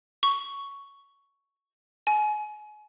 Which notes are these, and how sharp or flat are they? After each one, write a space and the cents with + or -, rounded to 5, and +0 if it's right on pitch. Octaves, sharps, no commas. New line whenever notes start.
C#6 +10
G#5 +30